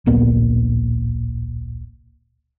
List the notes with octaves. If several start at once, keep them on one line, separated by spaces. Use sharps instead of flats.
D1 A#1 A#2 B3